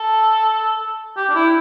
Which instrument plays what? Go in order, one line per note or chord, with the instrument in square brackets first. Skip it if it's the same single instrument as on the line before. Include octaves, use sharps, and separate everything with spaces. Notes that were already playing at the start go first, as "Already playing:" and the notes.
Already playing: [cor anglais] A4
G4
D4
E4